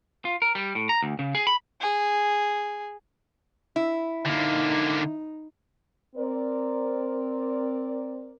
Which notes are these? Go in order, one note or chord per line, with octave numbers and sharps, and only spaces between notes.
F4
A#4
G3
A2
A#5
D2
C#3
G#4
B5
G#4
E4
D3 A#3 D#4
C4 A#4 D5